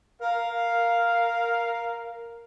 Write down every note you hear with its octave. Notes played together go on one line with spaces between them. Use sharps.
A#4 F5